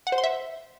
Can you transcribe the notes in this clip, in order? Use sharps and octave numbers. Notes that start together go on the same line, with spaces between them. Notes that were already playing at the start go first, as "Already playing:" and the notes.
F#5
C5
C6
E5